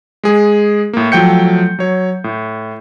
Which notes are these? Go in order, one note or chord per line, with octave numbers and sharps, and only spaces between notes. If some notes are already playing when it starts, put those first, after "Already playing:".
G#3 G#4
A2 A#3
F3 F#3 A3 G5 G6 C#7
F#3 C#5
A2